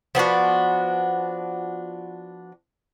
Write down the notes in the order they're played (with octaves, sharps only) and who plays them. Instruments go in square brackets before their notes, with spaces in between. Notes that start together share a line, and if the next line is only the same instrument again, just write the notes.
[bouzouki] F3 B3 D4 F#4